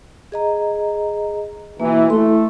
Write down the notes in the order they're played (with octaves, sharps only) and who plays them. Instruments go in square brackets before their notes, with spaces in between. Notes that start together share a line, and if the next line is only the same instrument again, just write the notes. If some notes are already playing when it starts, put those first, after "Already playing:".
[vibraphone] G#4 D#5 A#5
[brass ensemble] B2 E3 [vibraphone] A#3
[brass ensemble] A3 [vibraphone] E4 C6